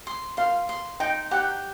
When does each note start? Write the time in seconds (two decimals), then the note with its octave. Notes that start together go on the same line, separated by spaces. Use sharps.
0.07 C6
0.37 F5 C6
0.69 C6
1.00 D#4 G5
1.31 G4 F#5